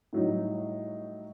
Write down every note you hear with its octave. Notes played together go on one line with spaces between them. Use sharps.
A2 F#3 G3 D#4